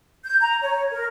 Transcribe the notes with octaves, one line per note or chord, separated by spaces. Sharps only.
G6
A#5
C#5
A#4